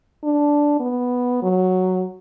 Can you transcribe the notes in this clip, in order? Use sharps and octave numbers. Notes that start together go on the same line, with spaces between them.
D4
B3
F#3